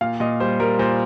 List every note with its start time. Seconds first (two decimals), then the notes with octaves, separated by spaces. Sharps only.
0.01 A#2 F5
0.20 A#2 D#5
0.40 G3 C5
0.60 G3 A#4
0.79 A#2 C5